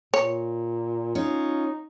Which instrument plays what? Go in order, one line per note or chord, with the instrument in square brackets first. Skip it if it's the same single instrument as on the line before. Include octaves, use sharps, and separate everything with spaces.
[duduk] A#2 [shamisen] C#5
[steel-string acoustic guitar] C#4 F4 [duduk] D#4